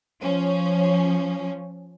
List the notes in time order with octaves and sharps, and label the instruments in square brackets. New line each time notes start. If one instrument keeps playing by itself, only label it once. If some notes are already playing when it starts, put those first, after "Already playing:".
[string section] F3 C#4